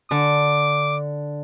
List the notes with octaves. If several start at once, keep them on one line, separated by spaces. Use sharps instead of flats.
D3 D6